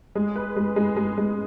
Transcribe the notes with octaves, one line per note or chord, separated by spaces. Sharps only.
G#3
B4
G#3
G#3
G#3
G#3